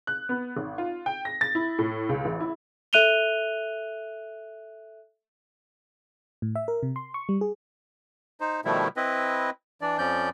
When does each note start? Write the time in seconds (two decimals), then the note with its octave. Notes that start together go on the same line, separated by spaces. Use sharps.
0.07 F#6
0.29 B3
0.57 G#1
0.78 F4
1.06 G5
1.25 A#6
1.41 A6
1.55 E4
1.79 A2
2.09 C#2
2.25 A1
2.40 E4
2.93 A4 E5 F#6 D#7 F7 G7
6.42 A2
6.55 E5
6.68 A#4
6.83 C3
6.96 C6
7.14 C#6
7.29 G3
7.41 G#4
8.40 D#4 C5
8.65 B2 D#3 F3 G3 A3 E4
8.97 C4 E4 B4 D#5
9.81 E3 D4 D5
9.98 F2 F3 C#4 D5 G6